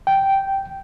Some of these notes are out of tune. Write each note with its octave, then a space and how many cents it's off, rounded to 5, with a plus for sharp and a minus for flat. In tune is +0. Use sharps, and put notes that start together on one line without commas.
G5 -10